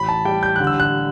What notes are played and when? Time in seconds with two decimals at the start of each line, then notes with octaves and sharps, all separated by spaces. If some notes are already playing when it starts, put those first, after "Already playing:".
Already playing: A1 B5
0.09 A5
0.25 G3 G5
0.43 G6
0.56 D3 F#6
0.67 E6
0.80 F#6